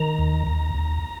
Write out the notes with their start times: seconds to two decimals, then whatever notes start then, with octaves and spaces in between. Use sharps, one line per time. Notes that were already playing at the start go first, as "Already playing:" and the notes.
Already playing: D#3 A#5
0.19 D#2
0.47 D#2
0.75 D#2